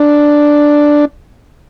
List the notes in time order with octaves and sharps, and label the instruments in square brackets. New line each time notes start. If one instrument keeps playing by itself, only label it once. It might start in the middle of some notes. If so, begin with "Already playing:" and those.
Already playing: [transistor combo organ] D4